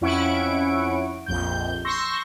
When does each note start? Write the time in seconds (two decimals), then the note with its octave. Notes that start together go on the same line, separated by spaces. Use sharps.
0.01 F2 C#4 E4 F#5 C#6 D7
1.26 A#1 F2 G6
1.85 C6 C#6 E6 G6 A#6